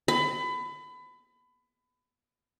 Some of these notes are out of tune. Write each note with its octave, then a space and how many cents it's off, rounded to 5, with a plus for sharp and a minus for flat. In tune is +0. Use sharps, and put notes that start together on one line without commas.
B5 +25